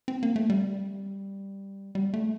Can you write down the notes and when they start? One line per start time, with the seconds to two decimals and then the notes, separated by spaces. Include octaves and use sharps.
0.08 C4
0.23 A#3
0.36 A3
0.50 G3
1.95 G3
2.14 A3